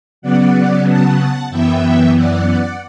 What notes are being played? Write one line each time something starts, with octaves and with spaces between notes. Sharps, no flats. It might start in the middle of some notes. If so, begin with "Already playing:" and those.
C#3 F#3 B3 D5 F#5
F#5 A5
F#2 E3 B3 E5 G5
D5 F#5